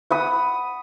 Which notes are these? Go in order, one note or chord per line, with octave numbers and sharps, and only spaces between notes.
F#5 B5 D#6